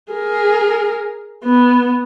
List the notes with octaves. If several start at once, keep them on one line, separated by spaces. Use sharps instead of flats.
G#4 A#4
B3